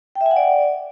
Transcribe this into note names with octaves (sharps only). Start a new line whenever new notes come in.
G5
E5
G#5
F#5
D5